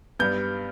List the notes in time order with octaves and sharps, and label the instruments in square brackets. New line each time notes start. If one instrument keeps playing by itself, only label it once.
[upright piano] G2 G3 B3 G6